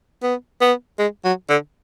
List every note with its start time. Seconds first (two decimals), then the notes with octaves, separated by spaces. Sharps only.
0.23 B3
0.61 B3
0.99 G#3
1.24 F#3
1.49 D3